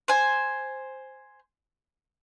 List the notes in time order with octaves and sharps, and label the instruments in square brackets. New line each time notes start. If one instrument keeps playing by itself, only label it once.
[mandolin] C5 G#5